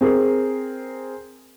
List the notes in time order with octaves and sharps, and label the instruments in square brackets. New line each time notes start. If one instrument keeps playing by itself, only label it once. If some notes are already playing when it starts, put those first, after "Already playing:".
[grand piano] C4 G#4 A#4